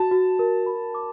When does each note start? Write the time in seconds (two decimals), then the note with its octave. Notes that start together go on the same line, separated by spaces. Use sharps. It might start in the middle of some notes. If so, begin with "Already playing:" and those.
Already playing: F#4 A5
0.11 F#4
0.39 A#4
0.66 B5
0.95 D6